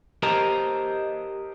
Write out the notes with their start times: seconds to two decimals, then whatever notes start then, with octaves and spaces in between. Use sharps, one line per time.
0.23 G4 A#4 C5 D#5 A5 A#5